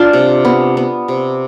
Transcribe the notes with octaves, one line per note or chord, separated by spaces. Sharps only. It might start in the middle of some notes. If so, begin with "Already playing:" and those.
Already playing: D4 F4
C3
B3
B3
C3